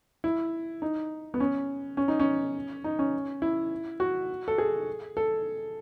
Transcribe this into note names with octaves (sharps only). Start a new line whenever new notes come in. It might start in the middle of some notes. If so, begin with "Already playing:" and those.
E4
D#4
B3
C#4
C#4
D#4
C#4
D#4
C#4
E4
F#4
A4
G#4
A4